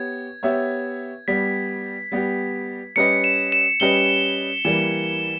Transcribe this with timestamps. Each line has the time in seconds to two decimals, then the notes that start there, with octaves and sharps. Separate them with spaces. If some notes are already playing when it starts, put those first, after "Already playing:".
Already playing: B3 G4 C#5 G#6
0.43 B3 G4 C#5 E5
1.28 G3 B3 G4 B6
2.12 G3 B3 G4
2.96 G3 C#4 G4 B4 D#5 C#7
3.24 E7
3.52 E7
3.80 G3 C#4 G4 B4 D#5 G7
4.65 E3 G3 A#3 E7